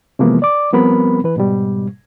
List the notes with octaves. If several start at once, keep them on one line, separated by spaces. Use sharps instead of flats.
C3 E3 F3 G#3 A#3 B3
D5 D6
F3 G3 B3 C4 A#4 B5
E3 B4
G#2 B2 G3